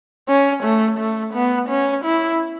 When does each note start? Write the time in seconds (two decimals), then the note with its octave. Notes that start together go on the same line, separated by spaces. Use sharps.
0.28 C#4
0.63 A3
0.98 A3
1.34 B3
1.69 C#4
2.04 E4